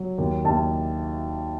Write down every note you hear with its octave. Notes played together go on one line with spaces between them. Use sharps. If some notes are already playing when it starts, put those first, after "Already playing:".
Already playing: F#3
D#2
D#2 A5